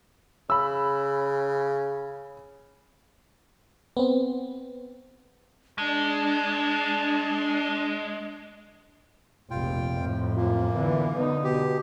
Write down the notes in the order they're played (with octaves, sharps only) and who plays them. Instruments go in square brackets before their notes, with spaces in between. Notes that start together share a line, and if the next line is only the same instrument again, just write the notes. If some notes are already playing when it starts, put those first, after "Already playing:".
[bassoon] C#3 [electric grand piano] B5 E6
[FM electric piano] B3 C4
[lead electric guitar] G#3 [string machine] D4 [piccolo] A5
[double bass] F1 A#1 [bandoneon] F4 G5
[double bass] F2 A2
[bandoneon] F#2 A#3 [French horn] F4
[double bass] D3 E3 [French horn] B3
[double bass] D3 D#4 [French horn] B3
[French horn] B2 [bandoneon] G4